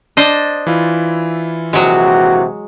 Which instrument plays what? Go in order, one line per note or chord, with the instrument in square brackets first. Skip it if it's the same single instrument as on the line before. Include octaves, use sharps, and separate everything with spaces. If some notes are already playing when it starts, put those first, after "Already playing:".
[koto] D4 C5 D#5
[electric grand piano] E3 E4 F4
[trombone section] A#1 C3 F#4 [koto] F#3 G#3